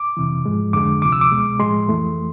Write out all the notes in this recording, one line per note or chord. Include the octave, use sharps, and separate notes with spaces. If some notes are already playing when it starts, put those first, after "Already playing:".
Already playing: D6
F2 C3 E3
G#2 F3 G#3
F2 D3 G#3 D6
D2 C3 F3 D6
E6
D6
C2 B2 G#3
A2 F3 G#3 C6
F2 E3 A3